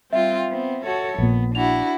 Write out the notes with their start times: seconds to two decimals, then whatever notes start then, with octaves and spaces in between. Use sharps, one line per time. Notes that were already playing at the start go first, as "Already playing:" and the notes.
0.13 G3 C4 F4 E5
0.49 B3 C4
0.85 F#4 A4 C#5
1.18 A#1 A#2 B3
1.55 D4 E4 F#4 F7